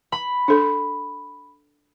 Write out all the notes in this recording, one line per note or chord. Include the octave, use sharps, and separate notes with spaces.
B5
D4 A4